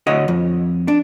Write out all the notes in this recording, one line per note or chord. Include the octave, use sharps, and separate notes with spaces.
D2 C#5 D#5 F#5
F2
D4